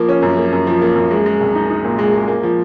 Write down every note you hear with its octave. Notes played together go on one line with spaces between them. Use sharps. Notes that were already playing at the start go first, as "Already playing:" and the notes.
Already playing: F3 A#3
C#4
F#2
A#3
F#2
F3
A#3
F#2
G#3
G#3
C2
D#4
D#4
A#2
G#3
G#3
A#3
F3